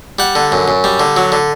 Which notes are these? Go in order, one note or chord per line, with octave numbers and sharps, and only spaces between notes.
G3 F#5
D3
F#2
F#2
G3
D3
F#3
D3